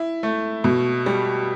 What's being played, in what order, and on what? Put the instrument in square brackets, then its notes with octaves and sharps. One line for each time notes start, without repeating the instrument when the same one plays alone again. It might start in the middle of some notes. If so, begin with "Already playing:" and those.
Already playing: [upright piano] E4
A3
B2
G3